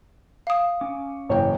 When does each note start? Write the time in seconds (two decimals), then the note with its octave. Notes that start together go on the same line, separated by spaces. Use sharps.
0.47 F5 D#6
0.81 C#4 D6
1.29 F#1 G#2 E3 C#5 G5